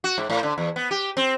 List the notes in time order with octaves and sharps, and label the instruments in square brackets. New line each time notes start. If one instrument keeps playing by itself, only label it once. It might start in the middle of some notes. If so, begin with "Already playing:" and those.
[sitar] F#4
G#2
A2
D3
E2
B3
G4
C4